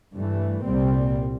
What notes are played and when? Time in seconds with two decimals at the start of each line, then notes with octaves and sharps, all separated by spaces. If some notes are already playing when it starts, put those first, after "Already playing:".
0.16 G2 E3 A3
0.65 C2 A#2 G3 C4